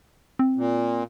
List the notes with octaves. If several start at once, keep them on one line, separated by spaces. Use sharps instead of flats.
C4
A#2